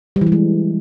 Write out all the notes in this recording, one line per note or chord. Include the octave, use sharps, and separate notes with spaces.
G3
E3
G3
G#3